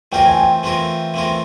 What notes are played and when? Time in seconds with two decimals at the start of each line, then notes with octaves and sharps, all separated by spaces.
0.12 E3 A3 C4 F4 A#4 G5
0.25 G#5
0.37 G5
0.63 E3 A3 C4 F4 A#4
1.14 E3 A3 C4 F4 A#4